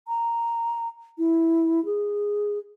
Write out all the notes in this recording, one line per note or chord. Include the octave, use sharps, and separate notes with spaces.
A#5
E4
G#4